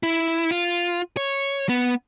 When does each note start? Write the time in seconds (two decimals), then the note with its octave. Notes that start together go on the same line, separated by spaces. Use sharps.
0.03 E4
0.51 F4
1.17 C#5
1.69 B3